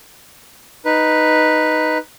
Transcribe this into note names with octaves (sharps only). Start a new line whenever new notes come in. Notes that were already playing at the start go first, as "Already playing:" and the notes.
D#4 B4